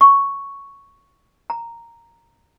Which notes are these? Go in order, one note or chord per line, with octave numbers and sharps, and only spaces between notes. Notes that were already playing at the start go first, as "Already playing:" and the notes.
C#6
A#5